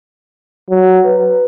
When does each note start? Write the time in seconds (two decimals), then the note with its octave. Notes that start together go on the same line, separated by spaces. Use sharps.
0.70 F#3
1.05 B4